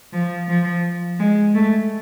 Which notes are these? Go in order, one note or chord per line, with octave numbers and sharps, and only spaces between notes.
F3
F3
G#3
A3